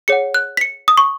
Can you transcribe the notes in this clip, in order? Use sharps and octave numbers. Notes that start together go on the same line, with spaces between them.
G#4 C#5 F#5 C#7
F#6
B6
C#7
D#6
C#6